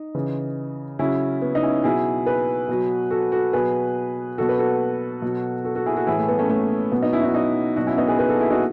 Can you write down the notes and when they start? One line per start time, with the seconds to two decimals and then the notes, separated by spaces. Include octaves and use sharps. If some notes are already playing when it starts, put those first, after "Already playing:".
Already playing: D#4
0.15 C#3 E3
0.99 C#3 F#3 C#4 E4
1.42 B3
1.55 D#4
1.63 C#4 E4
1.84 B2 F#3 E4 G#4
2.26 G#4 B4
2.69 B2 F#3
3.11 F#4 A4
3.32 F#4 A4
3.53 B2 F#3 G#4 B4
4.38 B2 F#3 F#4 A4
4.49 B4
4.59 F#4 A4
5.22 B2 F#3
5.65 F#4 A4
5.75 F#4 A4
5.86 E4 G#4
5.97 F#4 A4
6.07 A2 E3 E4 G#4
6.18 A3
6.28 B3
6.39 A3 C#4
6.50 A3
6.92 B2 F#3 B3
7.02 B3 D#4
7.13 C#4 E4
7.23 D#4 F#4
7.34 D#4 F#4
7.76 B2 F#3 D#4 F#4
7.87 C#4 E4
7.97 B3 D#4
8.08 G#4 B4
8.19 G#4 B4
8.29 F#4 A4
8.40 E4 G#4
8.51 D#4 F#4